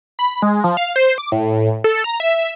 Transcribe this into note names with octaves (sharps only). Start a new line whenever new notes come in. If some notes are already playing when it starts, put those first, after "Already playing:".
B5
G#3
F3
F5
C5
D6
A2
A4
A#5
E5